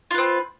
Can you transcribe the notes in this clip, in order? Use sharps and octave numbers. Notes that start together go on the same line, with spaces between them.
C4 F4 B4